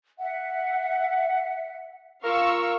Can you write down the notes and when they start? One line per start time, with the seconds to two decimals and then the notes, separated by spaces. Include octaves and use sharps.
0.19 E5 F#5
2.24 F4 A#4 F5 C#6 E6